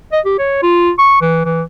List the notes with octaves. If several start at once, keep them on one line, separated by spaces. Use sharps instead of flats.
D#5
G4
C#5
F4
C#6
E3
E3